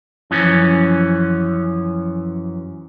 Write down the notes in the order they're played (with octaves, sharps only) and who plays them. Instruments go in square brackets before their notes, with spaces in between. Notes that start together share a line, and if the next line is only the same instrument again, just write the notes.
[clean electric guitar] F#2 E3 F3 C#4